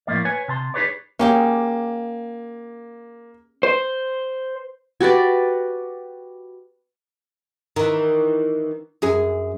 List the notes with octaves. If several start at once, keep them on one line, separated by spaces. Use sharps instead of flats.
A2 F3 A#3 D5
B4 C#5 G#5
C3 A5 C6
D#4 G4 G#4 B4 C#5 D5
A#3 C#4 G4 G#4
C5
F#4 G4 B4 D5
D#3 E3
F#2 G#4